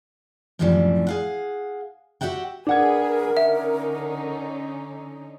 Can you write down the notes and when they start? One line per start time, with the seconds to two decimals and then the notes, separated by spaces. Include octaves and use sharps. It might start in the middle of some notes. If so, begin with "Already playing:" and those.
0.59 F#2 A2 C3 E3 F3 G3
1.07 G#4 F5 F#5
2.21 F#4 G4 E5 F#5 G5
2.67 D4 G#4 A#4 B4 F#5 G#5 G#6
3.37 D3 C#4 D#4 E5